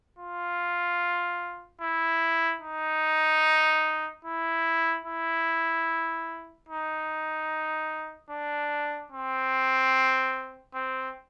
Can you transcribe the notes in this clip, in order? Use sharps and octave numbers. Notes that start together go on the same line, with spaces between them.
F4
E4
D#4
E4
E4
D#4
D4
C4
C4